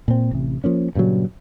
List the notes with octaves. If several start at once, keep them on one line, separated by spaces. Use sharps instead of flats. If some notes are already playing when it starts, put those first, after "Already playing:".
A#2 C4
A1 C3
F3 A#3 C#4
G2 A#2 C#3 F#3